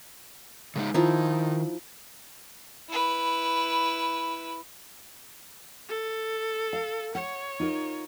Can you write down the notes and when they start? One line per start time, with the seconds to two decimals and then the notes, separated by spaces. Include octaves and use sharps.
0.76 C#3 G#3 D#4
0.94 D#3 F3 D#4 E4
2.89 E4 B4
5.88 A4
6.73 F5
7.15 C#5 F#5
7.60 D#4 F4 A#4